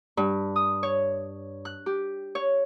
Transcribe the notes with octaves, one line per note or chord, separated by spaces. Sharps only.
G2
D#6
C#5
F#6
G4
C#5